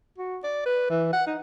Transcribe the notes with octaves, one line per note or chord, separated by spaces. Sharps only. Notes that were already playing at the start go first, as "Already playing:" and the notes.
F#4
D5
B4
E3
F#5
D#4